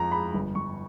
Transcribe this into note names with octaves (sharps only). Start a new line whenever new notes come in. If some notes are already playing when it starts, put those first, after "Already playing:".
Already playing: F2 F3 G#3 A#5
G#3 B5
G1
G1 C#6